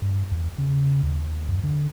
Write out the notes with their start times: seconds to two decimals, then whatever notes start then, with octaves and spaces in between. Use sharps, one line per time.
0.02 G2
0.31 E2
0.58 C#3
1.03 D#2
1.49 F#2
1.63 D3